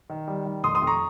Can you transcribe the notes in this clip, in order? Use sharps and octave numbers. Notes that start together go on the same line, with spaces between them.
D#3
G3
D#3
F1 C6 D#6
C6 D#6
F2
A#5 C#6